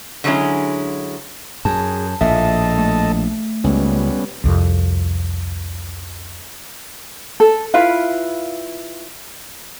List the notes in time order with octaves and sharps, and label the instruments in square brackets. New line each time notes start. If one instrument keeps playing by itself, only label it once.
[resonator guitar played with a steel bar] D3 F#3 G#3 C#4 E4
[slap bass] F#2 [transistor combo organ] G#4 [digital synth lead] A5
[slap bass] A#1 A2 [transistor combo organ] A4 D#5 A5 [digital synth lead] E5
[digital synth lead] A3
[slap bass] C#2 [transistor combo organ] G3 B3 C#4
[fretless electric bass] C2 F2
[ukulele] A4
E4 F4 B4 F5